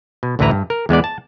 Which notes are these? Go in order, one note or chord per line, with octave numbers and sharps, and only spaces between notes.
B2
A1 D2 E3 E4 B4 A#5
G2
A#4
E2 G#3 B3 D5
A5